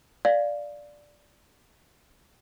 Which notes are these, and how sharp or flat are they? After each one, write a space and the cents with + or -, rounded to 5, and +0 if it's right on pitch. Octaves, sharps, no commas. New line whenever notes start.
D5 +0 F5 +0